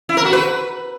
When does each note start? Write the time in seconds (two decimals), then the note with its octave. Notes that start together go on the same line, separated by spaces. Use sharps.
0.09 E4
0.17 A#4
0.25 F#4
0.33 B4